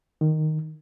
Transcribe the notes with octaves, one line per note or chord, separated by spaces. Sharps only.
D#3